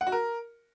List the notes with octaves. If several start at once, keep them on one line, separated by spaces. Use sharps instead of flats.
F#5
F#4
A#4